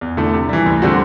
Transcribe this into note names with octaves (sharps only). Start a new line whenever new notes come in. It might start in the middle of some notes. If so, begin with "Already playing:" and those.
E2
D3 A3 E4
C3
E3 G3
D2
D3 G3 C4 F#4